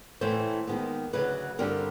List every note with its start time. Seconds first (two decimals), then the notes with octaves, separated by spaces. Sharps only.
0.21 A2 E3 A3 C#4 C5
0.67 D#2 D#3 G#3 B3
1.13 D2 C#3 F#3 B4
1.59 G2 D3 G3 C4 A#4